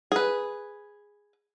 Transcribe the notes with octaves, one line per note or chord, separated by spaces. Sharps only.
G#4 B4